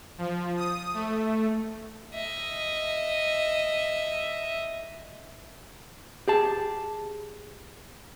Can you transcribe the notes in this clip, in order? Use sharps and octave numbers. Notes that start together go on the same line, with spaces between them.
F3
D#6
A3
D#5 E5
G4 G#4 A5